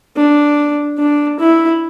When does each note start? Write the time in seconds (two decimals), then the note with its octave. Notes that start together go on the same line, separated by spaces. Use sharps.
0.16 D4
0.99 D4
1.39 E4